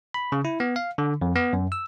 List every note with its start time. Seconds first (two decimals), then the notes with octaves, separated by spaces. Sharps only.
0.14 B5
0.32 C#3
0.45 E4
0.60 B3
0.76 F5
0.98 D3
1.22 F2
1.35 B3
1.53 F#2
1.72 E6